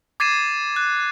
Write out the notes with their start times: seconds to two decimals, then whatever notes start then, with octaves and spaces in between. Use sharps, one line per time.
0.20 D6 G#6 A6 C7 D#7 E7
0.76 F#6